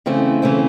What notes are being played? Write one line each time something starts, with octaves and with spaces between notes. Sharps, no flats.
C#3 E3 A3 C4
C#3 E3 A3 C4